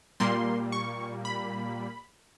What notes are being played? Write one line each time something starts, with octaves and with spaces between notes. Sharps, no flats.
A#2 G3 A#3 C6
C#6
B5